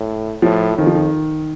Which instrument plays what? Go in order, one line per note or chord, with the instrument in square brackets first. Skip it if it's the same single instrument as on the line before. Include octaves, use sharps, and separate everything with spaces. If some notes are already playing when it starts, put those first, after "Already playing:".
Already playing: [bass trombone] A2
[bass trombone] A2 [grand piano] F3
[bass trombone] F2 [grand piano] D#3
[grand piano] F3
D#3